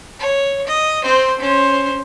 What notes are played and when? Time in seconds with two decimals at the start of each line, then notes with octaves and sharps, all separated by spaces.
0.20 C#5
0.67 D#5
1.03 C4 C5
1.40 C#4 C5